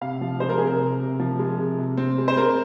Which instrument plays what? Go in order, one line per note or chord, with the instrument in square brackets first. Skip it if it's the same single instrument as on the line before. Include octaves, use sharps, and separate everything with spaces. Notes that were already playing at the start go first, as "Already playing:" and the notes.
[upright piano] C3 F5
F3
G#3 C5
A#4
C3 G#4
A#4
C3
C3
F3
G#3
C3
C3
C4
G#3
C5
C4 A#4